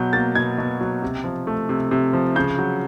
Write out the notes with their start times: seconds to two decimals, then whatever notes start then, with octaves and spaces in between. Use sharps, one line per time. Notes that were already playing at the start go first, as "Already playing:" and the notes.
Already playing: B2 F#3 G6
0.13 A#3 A6
0.35 B2 G#6
0.58 B2
0.80 F#3
1.02 C3
1.24 F3
1.47 A3
1.69 C3
1.91 C3
2.13 F3
2.36 C#3 G6
2.58 F#3